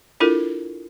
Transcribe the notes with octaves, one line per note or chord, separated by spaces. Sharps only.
D4 E4 F4 A4 A#4